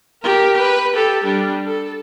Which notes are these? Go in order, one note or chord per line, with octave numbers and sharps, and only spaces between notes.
G4 A#4
B4
G4 A4
G3 D4
A4